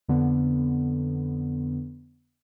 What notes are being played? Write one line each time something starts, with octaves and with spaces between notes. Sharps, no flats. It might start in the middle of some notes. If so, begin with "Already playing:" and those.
F2 D3 B3